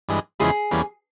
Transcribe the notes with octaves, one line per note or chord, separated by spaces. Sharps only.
G2 E3 G#3
E2 C#3 F3 G#3 E4 G#4
E2 E3 G3 A#3 C#4